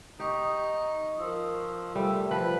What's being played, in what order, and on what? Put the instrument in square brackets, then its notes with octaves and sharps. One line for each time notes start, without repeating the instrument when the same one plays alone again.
[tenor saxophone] D#4 [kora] G4 [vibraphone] D#5 C#6 D#6
[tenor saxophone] F3 [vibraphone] A#4 E6
[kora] G3 [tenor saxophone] A3
[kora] F3 [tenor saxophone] B4 [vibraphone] C5